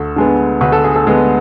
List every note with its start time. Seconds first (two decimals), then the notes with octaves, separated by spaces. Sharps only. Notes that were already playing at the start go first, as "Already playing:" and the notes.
Already playing: D2 A4
0.16 D3 G#3 B3
0.61 D2 B4
0.72 A4
0.84 G#4
0.96 A4
1.06 D3 G#3 B3